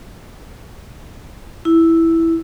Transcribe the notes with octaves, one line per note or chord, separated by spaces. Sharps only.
E4